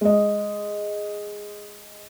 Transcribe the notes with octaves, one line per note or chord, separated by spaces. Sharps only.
G#3 D#5